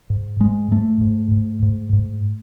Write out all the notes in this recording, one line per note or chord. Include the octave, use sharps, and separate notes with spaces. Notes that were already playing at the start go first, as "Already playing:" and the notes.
G#2
G#2 G#3
G#2 A3
G#2
G#2
G#2
G#2